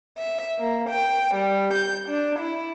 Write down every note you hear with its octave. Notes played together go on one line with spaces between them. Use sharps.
E5
A#3
G5
G3
G6
D4
E4